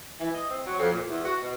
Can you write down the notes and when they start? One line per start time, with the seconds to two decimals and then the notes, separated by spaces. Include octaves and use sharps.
0.20 E3
0.33 D#5
0.50 C4
0.65 F#3
0.78 F2
0.91 A#2
1.07 E2
1.25 F#4
1.42 B2